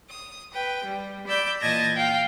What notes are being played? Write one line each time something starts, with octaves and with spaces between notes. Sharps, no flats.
D#6
B4 G5
G3
D5 B5 D6 E6 G6
A#2 E3 D#5 A5 G#6 A#6
F5 G5